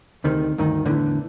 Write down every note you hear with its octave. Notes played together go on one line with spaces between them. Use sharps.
D2 C3 D#3
D2 G2 D#3
E2 A2 D3 E3